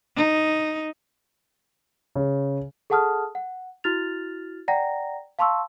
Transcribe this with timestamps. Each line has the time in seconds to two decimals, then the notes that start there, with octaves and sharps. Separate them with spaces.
0.16 D#4
2.16 C#3
2.90 G#4 A4 F#5 A5 D#6 F6
3.35 F#5
3.84 E4 F#4 F6 A6 F7
4.68 D5 F#5 G5 A#5 A#6
5.39 F5 A5 C6 C#6 E6